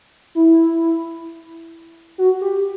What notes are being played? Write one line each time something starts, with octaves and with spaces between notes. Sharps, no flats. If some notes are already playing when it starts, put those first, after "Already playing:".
E4
F#4
G4